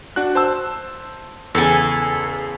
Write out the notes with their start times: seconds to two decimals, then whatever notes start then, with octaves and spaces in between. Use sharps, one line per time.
0.16 D4 F#4 F#6
0.35 C5 A5 E6
1.55 E2 C#3 A4 G#5